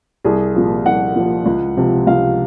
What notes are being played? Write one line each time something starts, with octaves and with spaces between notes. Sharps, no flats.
C2 G#4
A#2 F3
C2 F#5
A#2 F3
C#2
C3 F3
C#2 F5